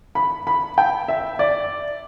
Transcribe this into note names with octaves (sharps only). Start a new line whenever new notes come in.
B5
B5
G5
E5
D5